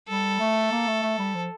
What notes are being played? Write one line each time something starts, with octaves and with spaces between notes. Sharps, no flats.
G3 A4
A3
A#3
A3
A3
G3
F3